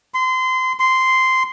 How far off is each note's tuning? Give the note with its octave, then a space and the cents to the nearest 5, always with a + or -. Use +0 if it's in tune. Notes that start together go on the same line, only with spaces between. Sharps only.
C6 -25
C6 -10